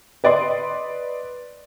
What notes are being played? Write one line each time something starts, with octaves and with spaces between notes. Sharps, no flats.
B4 D5 D#5 C6